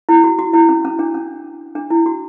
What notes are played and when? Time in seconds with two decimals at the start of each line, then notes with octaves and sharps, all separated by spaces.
0.09 E4
0.24 F#4
0.39 F#4
0.54 E4
0.69 C#4
0.85 C#4
0.99 D4
1.15 C#4
1.75 D4
1.90 E4
2.06 F#4